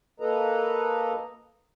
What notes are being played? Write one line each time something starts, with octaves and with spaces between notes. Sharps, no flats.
A#3 A4 B4 D#5 A#5